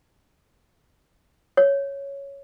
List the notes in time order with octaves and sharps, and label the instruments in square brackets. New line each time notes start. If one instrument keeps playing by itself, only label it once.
[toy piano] C#5